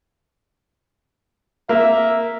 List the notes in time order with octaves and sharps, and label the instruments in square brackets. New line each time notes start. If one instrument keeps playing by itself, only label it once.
[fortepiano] A#3 [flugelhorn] E5